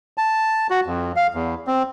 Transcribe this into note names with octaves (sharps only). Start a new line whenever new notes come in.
A5
F#4
F2
F5
E2
C4